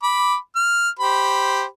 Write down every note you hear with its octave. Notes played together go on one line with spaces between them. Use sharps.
B5 D6
F6
G4 C5 B5